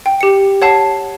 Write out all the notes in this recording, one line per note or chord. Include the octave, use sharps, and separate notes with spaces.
G5
G4 C#7
C#5 F#5 A5 C7